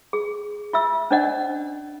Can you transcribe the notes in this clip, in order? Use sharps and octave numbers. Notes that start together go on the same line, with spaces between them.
G#4
F4 E5 E6
C#4 D4 C5 D5 D#5 F#5